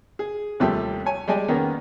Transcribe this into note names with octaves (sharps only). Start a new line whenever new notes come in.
G#4
D#2 C3 F3 G3 A3
C#5 G#5
G3 G#3 D5 D#5 G#5
D#3 A#3 B3 C#4